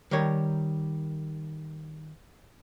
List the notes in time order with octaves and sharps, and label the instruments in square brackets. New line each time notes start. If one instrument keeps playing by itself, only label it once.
[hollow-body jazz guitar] D#3 G3 A#4 C#5